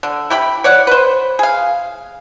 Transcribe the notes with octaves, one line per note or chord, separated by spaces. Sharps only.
D3
E4 G4 B5
C#5 D5 F#5
B4 C5
G#4 F5